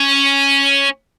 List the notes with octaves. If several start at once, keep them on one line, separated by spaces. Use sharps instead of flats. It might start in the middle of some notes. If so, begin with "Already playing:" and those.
Already playing: C#4